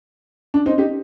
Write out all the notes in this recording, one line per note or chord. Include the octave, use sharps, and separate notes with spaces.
D4
C4 D#4
D#4 G4